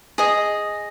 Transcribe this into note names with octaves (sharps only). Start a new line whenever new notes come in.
G#4 D#5